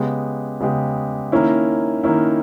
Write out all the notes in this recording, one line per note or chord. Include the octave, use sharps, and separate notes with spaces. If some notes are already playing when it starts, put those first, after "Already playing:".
Already playing: C#3 G#3 B3 G4
C#3 G#3 B3 G4
D#3 A#3 C#4 E4
D#3 A#3 C#4 E4